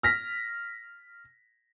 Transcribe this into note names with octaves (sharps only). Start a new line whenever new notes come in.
F6 A#6 B6